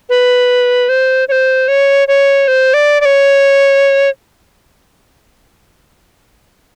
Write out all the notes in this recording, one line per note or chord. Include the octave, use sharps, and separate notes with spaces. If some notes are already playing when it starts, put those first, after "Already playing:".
B4
C5
C#5
C5
C#5
C#5
C5
D5
D5
C#5